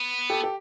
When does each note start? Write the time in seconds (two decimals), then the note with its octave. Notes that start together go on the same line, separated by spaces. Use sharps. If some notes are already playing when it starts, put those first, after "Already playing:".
Already playing: B3
0.30 G4 A4
0.44 G4